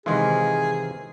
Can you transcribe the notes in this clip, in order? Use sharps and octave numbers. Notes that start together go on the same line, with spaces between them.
C3 D#3 E3 G#3 F4 G#4